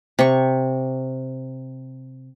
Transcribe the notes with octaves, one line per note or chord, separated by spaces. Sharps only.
C3 C#6